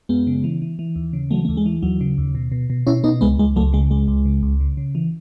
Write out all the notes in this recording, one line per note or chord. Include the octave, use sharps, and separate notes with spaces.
F#2 G#3 B3
C#3
E3
E3
E3
D#2
C#3
E3 F#3 A3
D#2 A3
G#3
E3
D#2 F#3
C#3
D#2
B2
B2
B2
B2 C#4 E4
B2 B3 D#4
C#2 G#3 B3
C#2 G#3
C#2 F#3 A3
C#3 G#3
C#2 G#3
C#2
C#3
C#2
C#3
C#3
E3